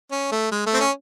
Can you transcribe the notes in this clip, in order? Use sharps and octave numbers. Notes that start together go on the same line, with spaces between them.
C#4
A3
G#3
A3
C4
C#4